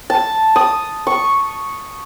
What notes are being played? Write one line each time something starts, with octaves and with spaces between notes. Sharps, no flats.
A5
D#6
C#6